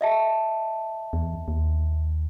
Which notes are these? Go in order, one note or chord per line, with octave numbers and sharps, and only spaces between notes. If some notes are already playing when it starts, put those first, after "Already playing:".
D#5 E5 A5
E2
D#2